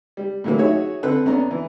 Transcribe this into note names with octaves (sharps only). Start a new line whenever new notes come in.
G3
A2 D3 E3 F#3 A#3
D#4 F#4 G#4 C#5 E5
D3 C4 A4 B4 F#6
F2 B3 C#4 D4 D5 A#5
E3